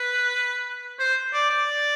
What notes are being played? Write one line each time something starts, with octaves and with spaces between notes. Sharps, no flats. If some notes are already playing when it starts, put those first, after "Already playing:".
Already playing: B4
C5
D5
D5